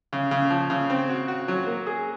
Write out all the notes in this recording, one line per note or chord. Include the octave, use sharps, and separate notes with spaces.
C#3
C#3
F3
C#3
C4
F#4
F#4
F#3
A#3
G#4